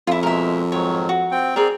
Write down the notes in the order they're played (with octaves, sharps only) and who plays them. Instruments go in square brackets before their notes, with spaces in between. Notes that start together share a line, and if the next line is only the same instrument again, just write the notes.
[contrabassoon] F2 [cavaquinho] E4 F4
[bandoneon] B2 G#3 [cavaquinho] A#4 E5
[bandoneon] G#2 D#3 F#3 [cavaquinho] C#5
[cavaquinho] F#4
[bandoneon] C4 G5
[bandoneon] C4 D5 [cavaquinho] G#4 A#4